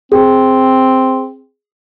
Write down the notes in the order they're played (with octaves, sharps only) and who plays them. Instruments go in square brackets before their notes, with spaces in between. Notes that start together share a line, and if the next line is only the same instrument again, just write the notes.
[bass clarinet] C4 [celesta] G#4